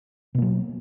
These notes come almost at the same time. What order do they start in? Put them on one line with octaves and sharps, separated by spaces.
B2 A#3 F#3